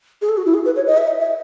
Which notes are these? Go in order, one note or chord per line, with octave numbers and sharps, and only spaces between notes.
G#4
A4
F#4
E4
G#4
B4
C#5
D#5
E5
D#5
E5